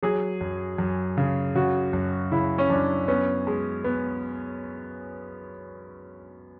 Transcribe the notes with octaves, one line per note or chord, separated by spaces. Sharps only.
F#3 G#4
F#2
F#2
C#3
C#3 F#4
F#2
C#3 E4
C#4
F#2 D4
B3 C#4
G#3
B3